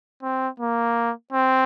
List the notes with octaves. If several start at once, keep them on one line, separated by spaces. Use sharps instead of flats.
C4
A#3
C4